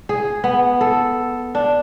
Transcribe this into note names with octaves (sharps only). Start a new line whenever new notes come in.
G#4
B3
A4
D4